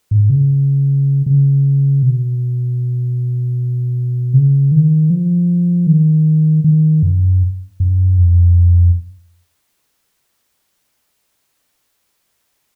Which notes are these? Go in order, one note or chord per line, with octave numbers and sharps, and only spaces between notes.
G#2
C#3
C#3
B2
C#3
D#3
F3
D#3
D#3
F#2
F#2
F2